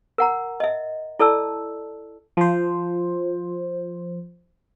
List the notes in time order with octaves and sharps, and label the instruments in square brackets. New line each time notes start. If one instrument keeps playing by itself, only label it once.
[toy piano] A#4 F#5 A#5
D#5 E5
E4 A4 D5 A5 E6
[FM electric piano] F3 C5